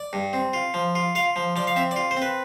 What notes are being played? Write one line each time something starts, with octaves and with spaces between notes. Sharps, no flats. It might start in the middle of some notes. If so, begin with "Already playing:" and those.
Already playing: D5
G2
C4
F4
F3
F4
F4 F5
F3
F3 D5
F5
C4 E5
D5
F4
C5
C4
B4